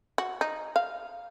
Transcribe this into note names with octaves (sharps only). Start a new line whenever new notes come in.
F#4
D#4
F5